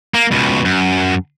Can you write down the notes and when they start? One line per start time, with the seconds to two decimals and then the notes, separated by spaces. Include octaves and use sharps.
0.14 A#3
0.31 C#2 B2
0.65 F#2